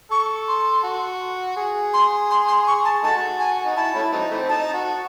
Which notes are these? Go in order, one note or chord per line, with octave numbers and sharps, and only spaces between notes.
A4 C#6
C6
F#4
G#4
C6
C6
C6
C#6
A5
A3 D#4 F#4 A5
G#5
D#4
E4 A5
A3 C#4 E4
F#3 C4 D#4
E3 A3 C4
D#4 A5
F#4